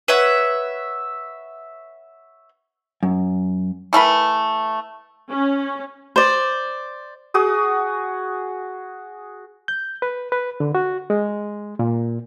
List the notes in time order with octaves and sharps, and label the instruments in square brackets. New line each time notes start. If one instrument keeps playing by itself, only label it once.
[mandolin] B4 C#5 E5 F#5
[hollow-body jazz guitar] F#2
[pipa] E3 A3 A#4 B4
[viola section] C#4
[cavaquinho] C5 D5
[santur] F#4 G#4 D#6
[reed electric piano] G6
B4
B4
D3
F#4
G#3
A#2